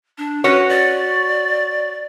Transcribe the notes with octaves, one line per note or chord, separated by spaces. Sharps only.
D4
C#4 F#4 B4 C#5
D5